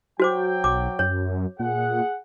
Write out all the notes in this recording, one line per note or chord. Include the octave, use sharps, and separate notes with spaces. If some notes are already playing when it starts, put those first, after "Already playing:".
F#3 F#4 C5 G5 D6
B1 D6
F#2 C#5
A#2 G#4 F#5